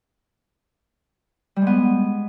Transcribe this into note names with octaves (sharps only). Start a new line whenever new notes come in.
G3
G#3
B3